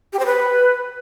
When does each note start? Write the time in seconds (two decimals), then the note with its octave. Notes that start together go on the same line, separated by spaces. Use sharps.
0.13 G4
0.19 C5
0.26 B4